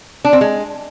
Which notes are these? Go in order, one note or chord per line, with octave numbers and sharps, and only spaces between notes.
D4
C4
G#3